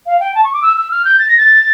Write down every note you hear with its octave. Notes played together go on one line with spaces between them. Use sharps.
F5
G5
A5
C#6
D6
E6
E6
F6
G6
A6
A#6
A6